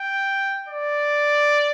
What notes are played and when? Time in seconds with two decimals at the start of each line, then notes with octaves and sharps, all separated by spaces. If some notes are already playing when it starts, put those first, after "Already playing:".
Already playing: G5
0.69 D5